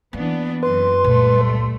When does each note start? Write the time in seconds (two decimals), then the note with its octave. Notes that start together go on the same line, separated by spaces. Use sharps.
0.13 E3 A#3 B3 D4
0.63 F#2 E3 B4 C6
1.04 C#2 A#2 G3 A3